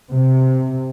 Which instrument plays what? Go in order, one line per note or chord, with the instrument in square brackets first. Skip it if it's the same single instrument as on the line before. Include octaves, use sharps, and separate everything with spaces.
[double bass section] C3